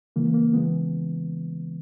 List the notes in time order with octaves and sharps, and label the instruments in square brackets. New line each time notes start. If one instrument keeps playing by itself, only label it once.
[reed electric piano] C#3 E3 G#3 A#3
A#3
C#3 E3 G#3 B3